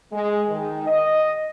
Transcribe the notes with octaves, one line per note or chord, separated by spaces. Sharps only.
G#3
D#3
D#5